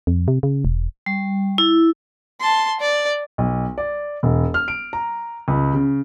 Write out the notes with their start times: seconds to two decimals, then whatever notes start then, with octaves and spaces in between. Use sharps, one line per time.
0.07 F2
0.28 C3
0.43 C#3
0.65 E1
1.06 G3
1.58 E4
2.41 A5 C6
2.80 D5
3.38 B1
3.78 D5
4.23 E1
4.54 F6
4.68 D7
4.93 A#5
5.48 C#2
5.73 C#3